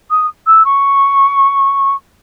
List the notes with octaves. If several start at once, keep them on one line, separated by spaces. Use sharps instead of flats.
D#6
E6
C#6